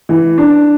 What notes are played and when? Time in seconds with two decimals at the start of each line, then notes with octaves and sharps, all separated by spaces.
0.09 E3
0.38 D4